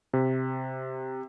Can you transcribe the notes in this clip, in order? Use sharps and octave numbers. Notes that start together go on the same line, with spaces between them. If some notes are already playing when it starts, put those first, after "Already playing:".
C3